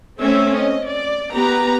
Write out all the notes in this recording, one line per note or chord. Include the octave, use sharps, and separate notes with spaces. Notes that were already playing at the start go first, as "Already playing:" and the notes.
A3 C4 C#4 E5
D#5
D5
B3 G4 B4 A#5